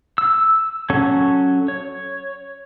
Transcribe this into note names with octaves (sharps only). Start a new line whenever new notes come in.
E6
F#3 C#4 A4 C#5
C#5